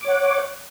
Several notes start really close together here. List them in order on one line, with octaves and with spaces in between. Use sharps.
D6 C#5 F#5